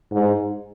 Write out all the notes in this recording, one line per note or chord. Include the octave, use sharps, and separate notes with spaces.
G#2